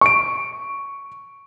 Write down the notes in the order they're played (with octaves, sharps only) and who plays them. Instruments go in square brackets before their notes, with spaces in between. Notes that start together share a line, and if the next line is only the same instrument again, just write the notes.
[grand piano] C#6 D7